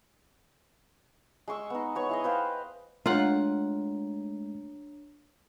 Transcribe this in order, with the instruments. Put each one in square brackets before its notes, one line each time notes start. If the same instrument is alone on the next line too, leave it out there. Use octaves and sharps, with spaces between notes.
[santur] G#3 C6 C#6 E6
B3 D#4
B3 C#5 C#6
E4 G#4 D#5
B4 C5 F5 G5
[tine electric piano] G#3 A3 [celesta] D4 C#5 A#5 [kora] F4 F#5